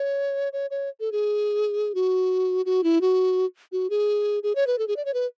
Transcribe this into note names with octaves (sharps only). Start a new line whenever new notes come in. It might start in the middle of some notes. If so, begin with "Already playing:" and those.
Already playing: C#5
C#5
C#5
A4
G#4
F#4
F#4
E4
F#4
F#4
G#4
G#4
C#5
B4
A4
G#4
D5
C#5
B4